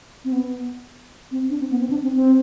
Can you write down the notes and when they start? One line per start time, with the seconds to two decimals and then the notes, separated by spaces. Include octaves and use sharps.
0.25 C4
0.33 B3
1.31 C4
1.50 D4
1.60 C4
1.71 B3
1.80 C4
1.90 D4
2.03 C4
2.16 C4